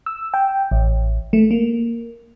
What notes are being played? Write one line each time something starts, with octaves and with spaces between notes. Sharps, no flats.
E6
G5
A1
A3
A#3